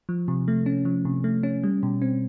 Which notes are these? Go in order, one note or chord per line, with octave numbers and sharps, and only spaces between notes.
F3
C3
A3
C#4
F3
C3
A3
C#4
G3
B2
C4